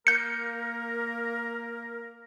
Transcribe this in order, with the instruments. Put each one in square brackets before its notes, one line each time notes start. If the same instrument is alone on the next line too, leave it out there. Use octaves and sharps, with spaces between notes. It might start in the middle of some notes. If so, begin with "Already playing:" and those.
[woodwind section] A#3 A#4 [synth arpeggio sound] G6 C#7